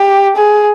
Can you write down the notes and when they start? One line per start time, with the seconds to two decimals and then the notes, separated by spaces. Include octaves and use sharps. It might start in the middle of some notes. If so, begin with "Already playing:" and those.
Already playing: G4
0.36 G#4